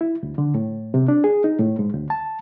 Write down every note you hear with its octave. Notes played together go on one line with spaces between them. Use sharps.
E4
D2
D3
A2
C3
D4
G#4
D#4
A2
G#2
D2
A5